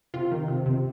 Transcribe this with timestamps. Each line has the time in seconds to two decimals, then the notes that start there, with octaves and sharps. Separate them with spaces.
0.14 C3 F4
0.31 D#3
0.48 C3
0.66 C3